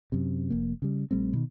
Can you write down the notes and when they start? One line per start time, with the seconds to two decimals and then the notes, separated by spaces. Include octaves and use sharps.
0.12 F#2 C3
0.50 F1 F2 A#3
0.82 C#3 G3
1.11 A#1 G3 A3 C4
1.33 B2 D#3